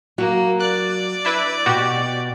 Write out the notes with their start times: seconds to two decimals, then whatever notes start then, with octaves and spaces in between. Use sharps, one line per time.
0.18 F#3 A#3 F#4
0.60 D5 F#6
1.25 D4 E4 B4
1.66 B2 F#4 G4